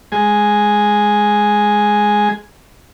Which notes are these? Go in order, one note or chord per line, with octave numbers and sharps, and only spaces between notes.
G#3 G#5